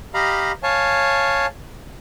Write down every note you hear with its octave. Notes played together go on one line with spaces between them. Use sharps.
G4 D#5 F5 A#5 B5
C#5 F5 G#5 A5